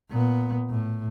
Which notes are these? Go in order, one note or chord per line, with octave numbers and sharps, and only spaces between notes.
A#2 B3
A2